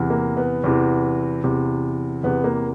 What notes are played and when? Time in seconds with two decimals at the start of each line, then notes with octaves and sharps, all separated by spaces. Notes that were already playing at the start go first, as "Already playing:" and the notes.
Already playing: E2 C3 E3
0.10 A#3
0.37 B3
0.64 E2 C3 E3
1.44 E2 C3 E3
2.24 E2 C3 E3 B3
2.44 A#3